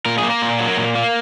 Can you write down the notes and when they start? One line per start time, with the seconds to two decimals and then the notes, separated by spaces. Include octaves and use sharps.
0.05 A#2 A#4
0.18 G#4
0.24 A#3
0.30 A#4
0.42 A#2
0.59 F#3
0.77 A#2
0.95 A#3